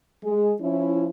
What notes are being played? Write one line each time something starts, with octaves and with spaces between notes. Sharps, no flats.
G#3
F3 C#4 E4